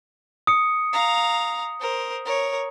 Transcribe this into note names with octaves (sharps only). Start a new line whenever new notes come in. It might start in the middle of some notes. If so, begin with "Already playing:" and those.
D#6 C#7
F5 A#5
A#4 C5
A#4 C#5